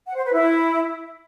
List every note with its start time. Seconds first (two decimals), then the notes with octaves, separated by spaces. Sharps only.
0.07 F#5
0.16 C5
0.25 B4
0.33 E4